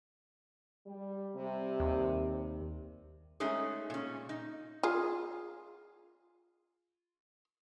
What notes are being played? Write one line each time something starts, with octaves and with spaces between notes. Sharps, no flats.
G3
C3 G3
D#2
G#3 A3 C#4 D#4 G#4
A#2 C#4
D#4
F4 G#4